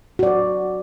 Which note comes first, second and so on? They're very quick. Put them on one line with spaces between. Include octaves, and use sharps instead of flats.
F#4 D5 C5